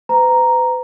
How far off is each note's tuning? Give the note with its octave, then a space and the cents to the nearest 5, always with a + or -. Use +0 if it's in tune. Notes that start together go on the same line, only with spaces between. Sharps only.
B4 +40 A#5 +0